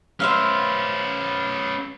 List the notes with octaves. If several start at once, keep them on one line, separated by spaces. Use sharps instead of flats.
C#4 B4 C5 E5 F5